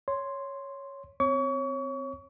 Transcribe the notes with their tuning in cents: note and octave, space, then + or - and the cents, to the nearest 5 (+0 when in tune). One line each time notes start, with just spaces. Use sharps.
C#5 +0 C6 +0
C4 -20 C#5 -20 C#6 +35